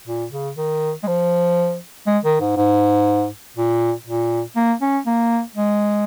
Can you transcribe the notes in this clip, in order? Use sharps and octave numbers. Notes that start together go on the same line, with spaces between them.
A#2
C#3
D#3
G#3
F3
G#3
D#3
G#2
G#2
A#2
A#2
A#3
C#4
A#3
G#3